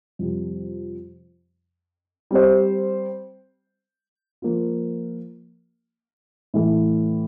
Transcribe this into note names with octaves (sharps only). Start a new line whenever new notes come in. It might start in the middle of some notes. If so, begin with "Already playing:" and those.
F2 C3 G3
G3 C4 G4 C5
F3 A#3 F4
A2 E3 A3